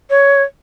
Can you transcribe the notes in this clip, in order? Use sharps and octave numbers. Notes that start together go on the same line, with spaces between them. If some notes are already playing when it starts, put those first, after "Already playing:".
C#5